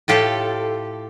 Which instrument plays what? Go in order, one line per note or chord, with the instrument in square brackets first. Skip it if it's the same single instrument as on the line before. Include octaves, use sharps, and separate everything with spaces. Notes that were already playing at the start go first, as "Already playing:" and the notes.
[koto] A2 F4 G4 A4